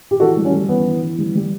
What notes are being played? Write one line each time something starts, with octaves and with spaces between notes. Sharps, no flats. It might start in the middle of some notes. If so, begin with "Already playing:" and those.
G4
E3 F#4 A4
G3
C#4
G3
E3 B3
E3
E3
G3
G3